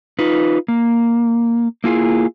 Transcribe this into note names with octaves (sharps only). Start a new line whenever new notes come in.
D#4 F4 B4
A#3
A#3 E4 F4 G#4